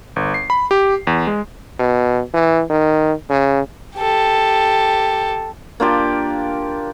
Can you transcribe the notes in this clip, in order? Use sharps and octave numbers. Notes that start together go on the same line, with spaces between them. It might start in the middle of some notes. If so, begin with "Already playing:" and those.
G1
C7
B5
G4
E2
G#3
B2
E3
D#3
C#3
G4 A4
A#3 D4 F4 G4